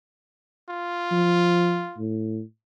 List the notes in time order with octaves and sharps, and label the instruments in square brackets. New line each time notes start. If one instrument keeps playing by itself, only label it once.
[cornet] F4
[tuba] F3
A2